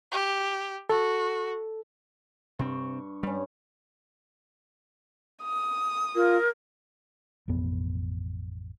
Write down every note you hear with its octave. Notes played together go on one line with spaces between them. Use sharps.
G4
F#4 A4
G2 C3 C4 C#6
G2 G3 C#4
D#6
F4 A#4
A1 F2 B2 B3